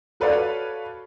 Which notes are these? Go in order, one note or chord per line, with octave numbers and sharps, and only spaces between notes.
F#4 A4 B4 C#5 D5 F5